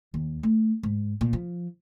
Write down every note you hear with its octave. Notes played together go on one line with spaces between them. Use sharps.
D#2
A3
G#2
A#2
F3